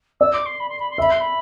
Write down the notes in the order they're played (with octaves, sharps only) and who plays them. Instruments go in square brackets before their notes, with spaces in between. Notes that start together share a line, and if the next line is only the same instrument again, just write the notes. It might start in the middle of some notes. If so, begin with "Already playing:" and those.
[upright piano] D5 [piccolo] E6
[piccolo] D6
C6
B5
C6
B5
C6
[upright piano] E5 [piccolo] B5
[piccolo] C6
B5